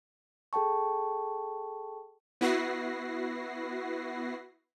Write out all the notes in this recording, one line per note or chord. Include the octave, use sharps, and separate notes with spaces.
G#4 A4 G5 A5 C#6
B3 E4 F#4 B4 A#6 C7